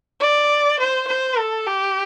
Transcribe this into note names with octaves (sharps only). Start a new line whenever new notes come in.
D5
C5
C5
A4
G4